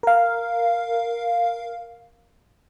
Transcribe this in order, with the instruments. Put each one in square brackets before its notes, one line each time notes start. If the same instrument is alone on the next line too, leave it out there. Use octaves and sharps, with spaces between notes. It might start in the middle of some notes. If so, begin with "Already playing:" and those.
[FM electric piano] A#4 F5